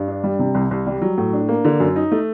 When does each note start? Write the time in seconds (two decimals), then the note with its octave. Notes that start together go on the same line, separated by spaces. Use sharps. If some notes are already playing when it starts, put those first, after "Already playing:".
Already playing: G2
0.08 D4
0.24 G3
0.39 C3
0.55 C2
0.71 C2
0.87 G3
1.02 F#3
1.18 A2
1.33 D4
1.49 A#3
1.65 D3
1.80 F#2
1.96 D#4
2.12 A3